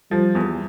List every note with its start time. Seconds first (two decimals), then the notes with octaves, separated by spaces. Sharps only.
0.11 F3 G3
0.35 E2